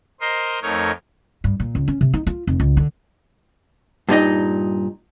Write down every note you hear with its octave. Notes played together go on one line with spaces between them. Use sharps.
A#4 C5 D#5 C6
F2 A3 D#4 A#4 C#5
G2
A#2
C#2
C#4
C3
D#4
F4
F1
C#2
D3
G2 A#2 D#4 D#5